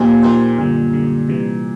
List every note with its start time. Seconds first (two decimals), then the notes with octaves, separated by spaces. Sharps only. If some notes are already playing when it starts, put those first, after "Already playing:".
Already playing: A#2 F3 A#3 D#4 G4 C5
0.22 F3 A#3 D#4 G4 C5
0.57 F#2 A#2 D3 G3
0.93 F#2 D3 G3
1.29 C3 E3 G3